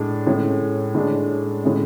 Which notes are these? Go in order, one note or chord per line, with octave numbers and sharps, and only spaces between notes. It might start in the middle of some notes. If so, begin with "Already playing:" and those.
Already playing: A2 G#3 D4
A2 G#3 C#4
A2 G#3 D4
A2 G#3 C#4